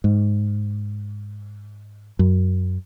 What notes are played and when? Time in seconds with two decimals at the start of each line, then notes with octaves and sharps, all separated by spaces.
0.04 G#2
2.19 F#2